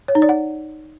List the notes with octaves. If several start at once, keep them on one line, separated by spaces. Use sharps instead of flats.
C#5
D#4
D5
F#5